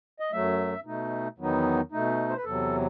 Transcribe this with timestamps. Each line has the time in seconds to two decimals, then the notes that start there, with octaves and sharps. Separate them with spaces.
0.20 D#5
0.32 F#2 F#3 A3 E5
0.85 B2 A3 D#4
1.38 E2 D#3 F#3 B3 D#4
1.92 B2 A3 D#4
2.29 C5
2.37 B4
2.44 E2 C3 F#3 A4